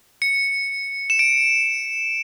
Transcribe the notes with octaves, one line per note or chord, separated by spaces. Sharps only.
C#7
E7
D7